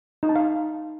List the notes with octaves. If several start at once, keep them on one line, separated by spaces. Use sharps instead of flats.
D#4
A5
F5